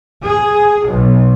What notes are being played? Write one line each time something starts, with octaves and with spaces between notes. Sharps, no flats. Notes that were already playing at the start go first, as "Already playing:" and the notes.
G#4
B1